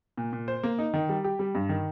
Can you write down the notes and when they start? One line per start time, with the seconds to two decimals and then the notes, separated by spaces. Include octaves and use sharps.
0.18 A#2
0.33 A#2
0.48 C5
0.63 A#3
0.79 D#4
0.94 D#3
1.09 G3
1.24 G4
1.39 G3
1.55 G2
1.69 D#3